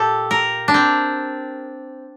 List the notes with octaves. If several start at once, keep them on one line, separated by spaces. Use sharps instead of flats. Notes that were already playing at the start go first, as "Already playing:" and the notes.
Already playing: A#2 G4 A4
A#4
D4
C4